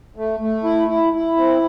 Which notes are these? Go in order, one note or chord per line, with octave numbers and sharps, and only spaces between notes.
A3
A3
E4
E4
E4
C4